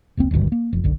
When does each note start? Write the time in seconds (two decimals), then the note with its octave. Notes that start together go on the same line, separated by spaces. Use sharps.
0.17 F1 C#2 A#3 C4
0.31 D#1 G#1 D2 G2
0.52 A#3
0.73 F1 F2
0.84 F#1 B1 D3